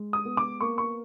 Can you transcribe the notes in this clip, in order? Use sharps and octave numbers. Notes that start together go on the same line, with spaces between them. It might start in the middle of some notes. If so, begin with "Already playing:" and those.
Already playing: G#3
D#6
B3
D6
A#3 C#6
C#6